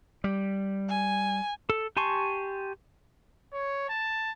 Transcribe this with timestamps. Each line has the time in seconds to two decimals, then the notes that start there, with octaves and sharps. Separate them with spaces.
0.24 G3
0.89 G#5
1.70 A4
1.97 G4 G#5 A5 C6 C#6
3.53 C#5
3.89 A5